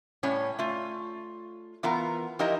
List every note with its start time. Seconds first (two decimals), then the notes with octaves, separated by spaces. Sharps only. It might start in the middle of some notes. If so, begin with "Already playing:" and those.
0.23 A2 G3 C#4 C#5
0.59 A3 F4
1.83 E3 B3 F4 A#4 A#5
2.39 F3 D#4 E4 G4 A#4 D#5